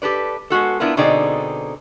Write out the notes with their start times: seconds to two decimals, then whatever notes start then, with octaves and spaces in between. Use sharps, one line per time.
0.02 G4 A4 B4 D5
0.50 G#3 B3 F#4 A4
0.80 B3 D4 E4 F4 A#4 B4
0.97 B2 D3 C4 D#4 G#4 D5